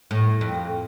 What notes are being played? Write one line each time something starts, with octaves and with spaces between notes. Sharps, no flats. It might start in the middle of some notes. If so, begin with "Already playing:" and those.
A2
F2